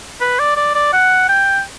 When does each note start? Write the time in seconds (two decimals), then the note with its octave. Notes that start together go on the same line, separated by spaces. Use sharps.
0.20 B4
0.39 D5
0.56 D5
0.75 D5
0.93 F#5
1.29 G5